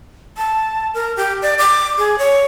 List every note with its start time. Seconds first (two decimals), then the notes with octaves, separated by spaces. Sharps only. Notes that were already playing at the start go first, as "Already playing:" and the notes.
0.37 A5
0.94 A#4
1.17 G4
1.42 D5
1.59 D6
1.98 G#4
2.18 C#5